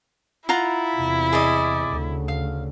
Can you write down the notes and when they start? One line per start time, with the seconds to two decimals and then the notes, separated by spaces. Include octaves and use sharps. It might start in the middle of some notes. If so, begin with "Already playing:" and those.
0.49 E4 F4 F#5 A#5
0.96 E2 C3
1.33 G#4 D5 D#5
1.90 D2 C#3
2.28 F5